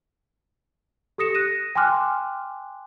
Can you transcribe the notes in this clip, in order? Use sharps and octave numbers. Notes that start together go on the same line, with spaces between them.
G4 A4 D#6 A#6 C#7 E7
F#6 A#6 D#7 E7
G5 G#5 C6 D6 F6 F#6